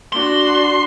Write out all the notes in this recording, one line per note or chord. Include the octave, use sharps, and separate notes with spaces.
D4 F#4 C6